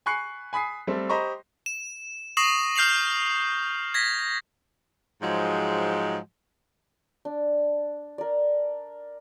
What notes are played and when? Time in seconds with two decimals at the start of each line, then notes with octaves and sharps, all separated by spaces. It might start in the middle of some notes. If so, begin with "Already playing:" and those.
0.06 G#5 B5 C#6 F#6 C7 C#7
0.53 G#5 B5 D#6 B6 C7
0.87 G3 A3 C4 A4
1.09 G4 C5 D#5 A#5 B5 C#6
1.66 E7
2.37 C#6 D#6 A#6 C7 E7 F#7
2.76 F6 G6 C7 F7 F#7
3.94 G#6 A#6 B6
5.22 G#2 F3 F#3 G#3
7.25 D4
8.18 A#4 D5